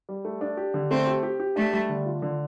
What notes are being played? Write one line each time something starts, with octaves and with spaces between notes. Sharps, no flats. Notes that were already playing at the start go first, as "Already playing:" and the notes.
G3
A3
D4
G4
D3
A3 C4
G4
G4
G4
A3 D4
G3
D3
F4
D3